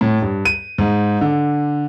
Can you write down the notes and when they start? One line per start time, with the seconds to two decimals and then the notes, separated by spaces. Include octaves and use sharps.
0.01 A2
0.22 G2
0.45 D#7
0.78 G#2
1.21 D3